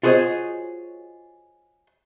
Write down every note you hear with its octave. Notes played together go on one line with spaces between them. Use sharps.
F4 F#4 G#4 C5 C#5 D#5